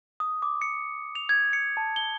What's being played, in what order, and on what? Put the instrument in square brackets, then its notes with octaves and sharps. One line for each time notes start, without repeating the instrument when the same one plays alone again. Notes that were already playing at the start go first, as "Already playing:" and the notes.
[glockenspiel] D#6
D6
C#7
F7
G#6
C#7
A5
G7